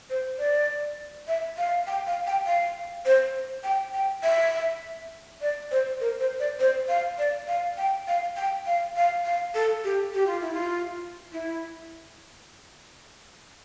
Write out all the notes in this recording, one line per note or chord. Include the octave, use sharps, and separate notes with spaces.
C5
D5
E5
F5
G5
F5
G5
F5
C5
G5
G5
E5
D5
C5
A#4
C5
D5
C5
F5
D5
F5
G5
F5
G5
F5
F5
F5
A4
G4
G4
F4
E4
F4
E4